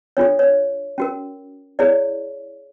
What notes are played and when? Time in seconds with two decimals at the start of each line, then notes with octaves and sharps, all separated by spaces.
0.17 D4 F4 A4 C#5
0.39 C#5
0.98 C#4 F#4 A#4
1.79 E4 G#4 C#5 D5